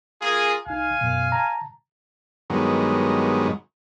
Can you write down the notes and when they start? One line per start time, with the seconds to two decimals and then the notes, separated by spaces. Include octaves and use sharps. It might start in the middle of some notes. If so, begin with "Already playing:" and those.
0.22 A#3 F4 G#4
0.67 C2 D#4 F5 G#5
1.01 F#2 B2
1.32 A5 A#5
2.50 G2 D#3 F#3 G#3 B3